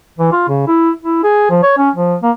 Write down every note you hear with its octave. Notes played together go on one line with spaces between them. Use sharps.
E3
F4
C#3
E4
E4
G#4
F3
C#5
C#4
F3
A#3